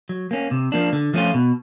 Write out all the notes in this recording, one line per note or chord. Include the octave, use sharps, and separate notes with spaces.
F#3
A#3 C#4
C3
F3 A#3 D4
D3
F3 A3 C#4 F4
B2